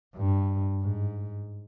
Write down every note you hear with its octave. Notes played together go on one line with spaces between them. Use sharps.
G2
G#2